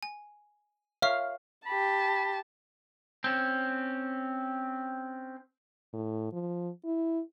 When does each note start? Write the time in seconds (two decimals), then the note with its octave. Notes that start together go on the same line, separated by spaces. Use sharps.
0.03 G#5
1.02 C#5 E5 F5 C#6
1.66 G4 A5 B5
3.24 C4 C#4
5.93 A2
6.32 F3
6.85 E4